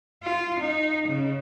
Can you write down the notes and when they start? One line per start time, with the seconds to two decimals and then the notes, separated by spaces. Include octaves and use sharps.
0.23 F4
0.60 D#4
1.08 C#3